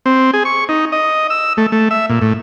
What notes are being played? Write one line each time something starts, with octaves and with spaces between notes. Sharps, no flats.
C4
G#4
C#6
D#4
D#5
E6
A3
A3
E5
A#2
A2